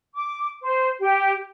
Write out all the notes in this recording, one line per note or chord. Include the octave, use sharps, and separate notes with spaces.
D6
C5
G4